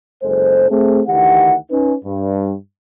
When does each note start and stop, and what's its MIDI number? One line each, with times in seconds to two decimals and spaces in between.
0.22 0.66 30
0.22 0.66 35
0.22 0.66 56
0.22 0.66 69
0.22 0.66 72
0.70 1.01 57
0.70 1.01 60
0.70 1.01 68
1.08 1.55 38
1.08 1.55 51
1.08 1.55 52
1.08 1.55 67
1.08 1.55 78
1.71 1.94 61
1.71 1.94 63
1.71 1.94 71
2.04 2.53 43